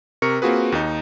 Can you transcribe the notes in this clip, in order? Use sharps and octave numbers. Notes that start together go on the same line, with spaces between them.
C3 A#4 C#6 C#7
A#3 C4 F4 F#4 G#4 B4
D#2 D#4